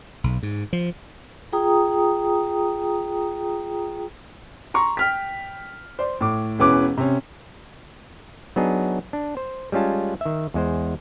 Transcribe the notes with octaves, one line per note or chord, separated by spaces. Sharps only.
B1
G#2
F3
F4 G#4 G5 A#5 D#6
A#5 C6 C#6
G5 F6 B6
C5 D5
A2 D6
E1 B2 E3 C#4 B4 D6
C3 C#4
F#3 B3 D4 D#4 G#4
D4
C5
G3 G#3 C#4 F4 A5
D#3 E5
E2 G#3 C5